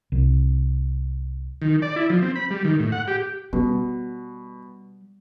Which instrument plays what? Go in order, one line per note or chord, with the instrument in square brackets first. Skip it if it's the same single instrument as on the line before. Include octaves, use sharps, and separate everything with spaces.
[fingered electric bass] C2
[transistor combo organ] D#3
D5
E4
F3
C4
B5
G3
D#3
A2
F#5
G4
[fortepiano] B2 [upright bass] G3